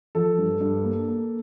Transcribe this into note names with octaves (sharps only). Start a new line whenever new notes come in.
F3 A4
G2
G2
A#3
A#3